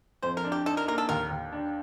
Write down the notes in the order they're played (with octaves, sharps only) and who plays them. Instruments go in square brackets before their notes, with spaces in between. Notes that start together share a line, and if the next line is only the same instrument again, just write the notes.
[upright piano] F2 [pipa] C5
[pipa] A#4
[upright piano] D4
[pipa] G4
[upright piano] D#4 [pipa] A4
[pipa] A#4
[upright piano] A#3 [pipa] A#4
[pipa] A4
[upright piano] D#2 [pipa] A#4
[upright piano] D#2
D4